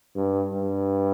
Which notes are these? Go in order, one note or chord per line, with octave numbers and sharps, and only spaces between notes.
G2
G2